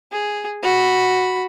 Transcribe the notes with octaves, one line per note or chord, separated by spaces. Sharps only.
G#4
F#4 B5